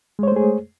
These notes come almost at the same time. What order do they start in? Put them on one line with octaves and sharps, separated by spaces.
G#3 C#5 C5 A3 G#4